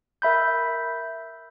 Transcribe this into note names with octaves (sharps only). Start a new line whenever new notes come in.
A#4 E5 B5 G6